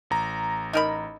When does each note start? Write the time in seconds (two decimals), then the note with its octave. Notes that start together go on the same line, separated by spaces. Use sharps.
0.10 A1 A#5
0.73 D#4 A#4 B5